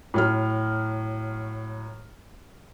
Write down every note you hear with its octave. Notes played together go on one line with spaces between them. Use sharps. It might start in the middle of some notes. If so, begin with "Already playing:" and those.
A2 F#3 F6